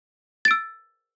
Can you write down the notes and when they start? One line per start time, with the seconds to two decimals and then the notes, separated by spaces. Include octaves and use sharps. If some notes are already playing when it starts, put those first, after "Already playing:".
0.45 A6
0.48 D7
0.51 E6